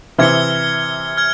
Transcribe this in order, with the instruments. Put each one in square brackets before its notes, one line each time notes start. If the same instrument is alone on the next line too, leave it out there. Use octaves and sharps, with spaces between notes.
[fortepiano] C3 E3 [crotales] F6 G#6 C#7 G7
[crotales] F6 G#6